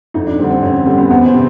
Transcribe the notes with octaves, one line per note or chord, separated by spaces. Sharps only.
F2 D#4
D4
D3 G3 C4
C4
F2 C#4
C#4
D3 G3 C4
B3
E2 B3
C4
C3